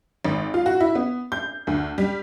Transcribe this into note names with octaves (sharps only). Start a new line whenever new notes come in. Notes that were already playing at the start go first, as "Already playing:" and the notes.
G#1
F4
F#4
E4
B3
G6
D2
G3